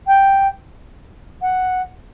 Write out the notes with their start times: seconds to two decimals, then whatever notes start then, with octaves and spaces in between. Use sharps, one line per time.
0.07 G5
1.42 F#5